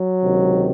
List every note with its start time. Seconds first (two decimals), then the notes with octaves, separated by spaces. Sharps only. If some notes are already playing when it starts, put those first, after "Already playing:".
Already playing: F#3
0.23 C#2 C3 D#3